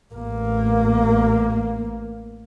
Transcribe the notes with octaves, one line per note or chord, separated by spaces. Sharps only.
A1 A#3